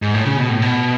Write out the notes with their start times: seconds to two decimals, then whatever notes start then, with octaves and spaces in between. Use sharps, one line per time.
0.02 G#2
0.14 A2
0.25 C#3
0.37 B2
0.49 A2
0.62 B2